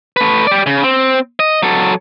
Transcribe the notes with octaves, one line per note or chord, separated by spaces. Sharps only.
A3 B4
G4 D5
C#3
C4
D#5
F#3 A4